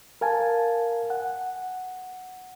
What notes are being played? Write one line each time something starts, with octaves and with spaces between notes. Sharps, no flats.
A#4 F5 G#5 A5
F#5